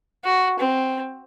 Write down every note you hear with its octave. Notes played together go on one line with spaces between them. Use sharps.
F#4
C4